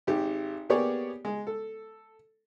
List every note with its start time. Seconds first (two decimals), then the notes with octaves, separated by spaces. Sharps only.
0.07 G#1 G4
0.69 A#3 B3 G4 G#4 C#5 D5
1.25 G#3
1.47 A4